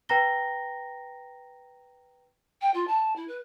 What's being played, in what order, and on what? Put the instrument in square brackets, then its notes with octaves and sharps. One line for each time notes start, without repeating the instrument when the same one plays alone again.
[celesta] B4 G5 A#5 A#6 G7
[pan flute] G5
F4
A5
E4
B4